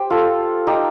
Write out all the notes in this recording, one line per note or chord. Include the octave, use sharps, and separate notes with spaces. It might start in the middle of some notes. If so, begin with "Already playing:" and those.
Already playing: G4 C5
F4 A4
D#4 G4